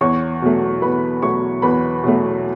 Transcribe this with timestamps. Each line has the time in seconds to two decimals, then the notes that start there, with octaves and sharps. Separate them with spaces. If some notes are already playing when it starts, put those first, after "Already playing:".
0.01 E2 C#5 C#6
0.42 B2 F#3 A3
0.82 E2 B4 B5
1.22 B2 F#3 A3 C#5 C#6
1.62 E2 B4 B5
2.04 B2 F#3 A3